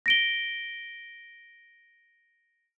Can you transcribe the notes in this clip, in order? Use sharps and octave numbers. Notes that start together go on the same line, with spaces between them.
A#6 D7 G7